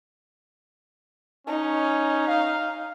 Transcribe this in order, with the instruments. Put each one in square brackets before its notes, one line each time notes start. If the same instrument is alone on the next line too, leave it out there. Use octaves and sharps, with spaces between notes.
[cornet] C#4 [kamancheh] D#4
[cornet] F5